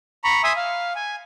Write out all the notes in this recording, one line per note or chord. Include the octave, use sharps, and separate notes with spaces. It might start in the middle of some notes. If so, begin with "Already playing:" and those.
A#5 B5 C#6
E5 G#5 C6 D#6 E6
F5
G#5